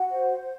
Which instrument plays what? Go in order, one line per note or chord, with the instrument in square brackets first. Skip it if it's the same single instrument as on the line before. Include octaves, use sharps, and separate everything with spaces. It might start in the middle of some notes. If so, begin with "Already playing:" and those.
Already playing: [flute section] F#4 F#5
C5